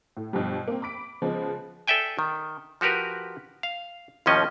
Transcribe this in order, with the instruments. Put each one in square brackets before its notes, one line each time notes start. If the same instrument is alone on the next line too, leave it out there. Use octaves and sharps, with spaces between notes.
[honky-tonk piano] A2
G2 B2 F3 G3
A#3 C4
B5 D6 B6 D7
C#3 F3 G#3 B3
[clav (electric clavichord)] A4 D5 E5 G5 G#5
D#3
F3 F#4 G4 A#4 B4
F5
D#2 A2 D#3 F3 C#4 D#5